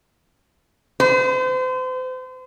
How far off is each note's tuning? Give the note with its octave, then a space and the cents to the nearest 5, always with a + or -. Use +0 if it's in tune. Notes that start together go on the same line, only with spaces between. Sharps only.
C5 -35